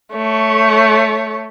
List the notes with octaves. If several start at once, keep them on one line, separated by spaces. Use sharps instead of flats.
A3 C#5